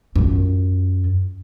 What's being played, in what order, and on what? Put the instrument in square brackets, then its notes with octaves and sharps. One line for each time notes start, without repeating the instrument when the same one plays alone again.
[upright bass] F#2 F4